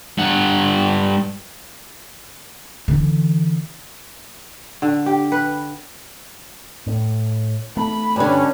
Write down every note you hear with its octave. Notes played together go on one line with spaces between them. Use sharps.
G2 F#5
D3 E3
D3
G4
B4
A2
A3 B5
G2 D3 C#4 D4